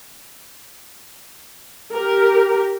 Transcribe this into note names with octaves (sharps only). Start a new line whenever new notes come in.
G4 A#4